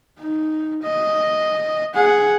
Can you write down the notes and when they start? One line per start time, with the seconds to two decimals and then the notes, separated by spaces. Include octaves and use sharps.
0.19 D#4
0.83 D#5
1.94 G#4 F#5